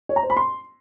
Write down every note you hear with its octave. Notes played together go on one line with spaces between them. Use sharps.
C#5
A#5
C5
B5
C6